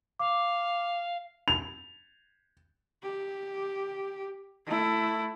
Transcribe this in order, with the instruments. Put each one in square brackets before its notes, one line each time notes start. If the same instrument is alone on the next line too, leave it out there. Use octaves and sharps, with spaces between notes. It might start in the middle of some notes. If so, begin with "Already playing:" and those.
[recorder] F5 [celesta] D6
[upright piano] F7
[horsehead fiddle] G4
A3 E4